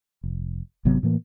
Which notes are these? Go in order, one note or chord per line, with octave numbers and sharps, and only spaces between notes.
F1
G#1 C3 F#3 B3
A2 E3 A#3